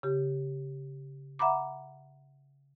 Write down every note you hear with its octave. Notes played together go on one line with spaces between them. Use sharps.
C#3 G4
E5 F#5 A#5 B5 D6